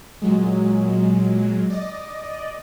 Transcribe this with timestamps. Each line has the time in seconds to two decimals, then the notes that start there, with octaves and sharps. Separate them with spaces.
0.22 A#2 F#3 G#3
1.70 D5 D#5